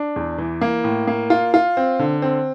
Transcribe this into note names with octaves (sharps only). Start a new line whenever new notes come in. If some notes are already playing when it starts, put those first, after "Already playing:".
Already playing: D4
E2
E3
A#3
A2
A#3
F4
F4
C4
D3
C4